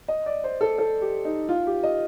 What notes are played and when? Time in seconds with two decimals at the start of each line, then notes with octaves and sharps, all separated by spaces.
0.08 D#5
0.26 D5
0.44 C5
0.61 A4
0.78 A4
1.01 G4
1.25 D#4
1.49 F4
1.67 G4
1.83 D#5